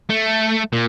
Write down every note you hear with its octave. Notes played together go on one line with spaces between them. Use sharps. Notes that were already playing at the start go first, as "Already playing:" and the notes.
A3
A#2